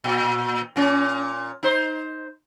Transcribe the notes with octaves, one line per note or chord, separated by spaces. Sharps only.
A#2
A#2 C#4
D#4 C5